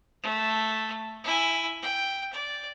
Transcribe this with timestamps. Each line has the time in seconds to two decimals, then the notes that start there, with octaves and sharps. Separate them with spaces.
0.23 A3
1.24 E4 G#5
1.82 G5
2.33 D5